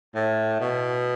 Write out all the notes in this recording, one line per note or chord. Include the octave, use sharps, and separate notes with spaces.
A2
B2